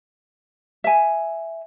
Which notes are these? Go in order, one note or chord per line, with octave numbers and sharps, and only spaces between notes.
E5 G#5